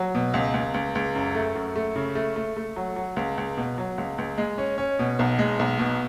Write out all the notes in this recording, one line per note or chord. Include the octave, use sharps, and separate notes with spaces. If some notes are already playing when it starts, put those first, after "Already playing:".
Already playing: F#3
B2
C#2
C#2
C#2
C#2
F#2
A3
F#2
A3
C#3
A3
A3
A3
F#3
F#3
C#2
C#2
B2
F#3
C#2
C#2
G#3
C#4
C#4
B2
B1
G#3
B1
B2